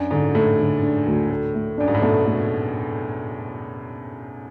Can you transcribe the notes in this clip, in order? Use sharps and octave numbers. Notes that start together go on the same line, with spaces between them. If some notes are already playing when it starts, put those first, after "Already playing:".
Already playing: F#2 D4
G#2 D3
A2 A3
D3
D4
D2
A3
A3
F#2 D4
G#2
A2
B2 A3
A3